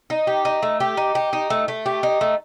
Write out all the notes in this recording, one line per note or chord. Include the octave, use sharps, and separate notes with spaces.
D#4
G4
D#4
A3
G4
D#4
G4
D#4
A3
A3
G4
D#4
A3